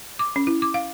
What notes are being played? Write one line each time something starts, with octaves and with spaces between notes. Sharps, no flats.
D6
C#4
E4
D6
F5